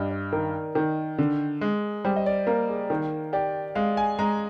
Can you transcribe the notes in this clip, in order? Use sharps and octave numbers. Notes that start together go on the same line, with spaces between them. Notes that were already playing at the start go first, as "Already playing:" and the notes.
Already playing: G2 D5 D#5
D5
D#3 A#4
D#3
D3
G#3
G3 C5
D#5
D5
A#3 A#4
G#4
D#3 A#4
G4 D5
G#3 F5
G#5
G#3 A#5